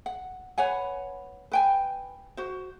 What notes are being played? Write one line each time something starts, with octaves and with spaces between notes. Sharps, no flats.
F#5
B4 C#5 F#5 G#5
B4 G5 G#5
F#4 C5